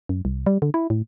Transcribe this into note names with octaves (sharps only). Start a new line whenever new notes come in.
F#2
C2
G3
D3
E4
A2